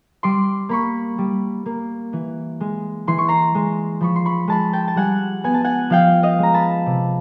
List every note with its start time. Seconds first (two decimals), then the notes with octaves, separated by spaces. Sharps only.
0.23 G3 C6 D6
0.69 A#3 B5 C#6
1.18 G3
1.66 A#3
2.13 E3
2.60 G#3
3.07 E3 C6
3.18 C#6
3.28 A#5 C6
3.55 G#3
4.01 F3 B5 C#6
4.16 C6
4.26 B5 C#6
4.48 G#3 A5 B5
4.73 G5 A5
4.88 A5
4.96 G3 F#5 G#5
5.44 B3 G#5
5.54 A5
5.64 F#5 G#5
5.90 F3 F5 G5
6.23 D#5 F5
6.39 G#3 A#5
6.54 A5 B5
6.86 C3